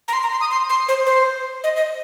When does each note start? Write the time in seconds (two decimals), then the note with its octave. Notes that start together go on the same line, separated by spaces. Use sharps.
0.08 A#5
0.13 C6
0.23 A#5
0.32 C6
0.41 D#6
0.51 C6
0.69 C6
0.88 C5
1.06 C5
1.64 D#5
1.76 D#5